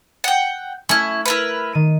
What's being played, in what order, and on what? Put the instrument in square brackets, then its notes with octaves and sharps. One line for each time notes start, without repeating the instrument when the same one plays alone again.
[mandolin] F#5 G5
[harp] A3 F6 [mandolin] C#4 E4
[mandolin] E4 A#4 B4
[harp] D#3 D#7